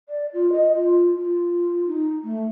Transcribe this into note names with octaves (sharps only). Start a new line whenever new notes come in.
D5
F4
D#5
F4
F4
D#4
A3